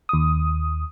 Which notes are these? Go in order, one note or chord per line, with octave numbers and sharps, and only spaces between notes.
D#2 D#6